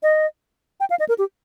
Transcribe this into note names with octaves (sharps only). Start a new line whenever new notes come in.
D#5
G5
F5
D#5
A#4
G4